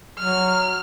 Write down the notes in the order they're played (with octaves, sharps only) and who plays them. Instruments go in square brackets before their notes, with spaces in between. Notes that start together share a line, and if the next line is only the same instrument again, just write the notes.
[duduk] F#3 [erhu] F6